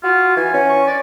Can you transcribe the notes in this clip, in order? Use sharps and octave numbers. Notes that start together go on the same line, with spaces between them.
F4 F#4
E3 G#5
C#4
C#6
D5